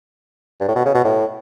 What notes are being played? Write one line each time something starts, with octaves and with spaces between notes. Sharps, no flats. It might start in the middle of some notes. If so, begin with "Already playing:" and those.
G2
A2
B2
C#3
B2
A2